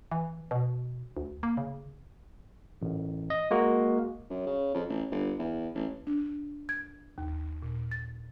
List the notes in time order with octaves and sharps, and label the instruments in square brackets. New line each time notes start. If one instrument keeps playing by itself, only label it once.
[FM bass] E3
B2
D2
A#3
C#3
[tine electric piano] A1
D#5
G#3 A#3 F#4
[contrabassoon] F#2
C#3
F2
A1
G1
E2
A1
[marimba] D4
G#6
D#2
A#2
A6